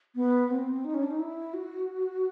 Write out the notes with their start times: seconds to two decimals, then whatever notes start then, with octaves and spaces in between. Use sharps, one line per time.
0.15 B3
0.50 C4
0.85 D#4
0.94 C#4
1.03 D4
1.11 D#4
1.19 E4
1.54 F#4